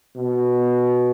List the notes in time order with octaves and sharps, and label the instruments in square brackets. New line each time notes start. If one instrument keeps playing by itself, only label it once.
[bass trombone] B2